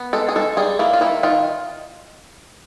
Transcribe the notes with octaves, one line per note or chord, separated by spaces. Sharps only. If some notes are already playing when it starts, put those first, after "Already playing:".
Already playing: B3
G#3 A4
G#4
G#3 A4
G3 G#4
A#3 E4
F4
D#3 E4
D#3 F4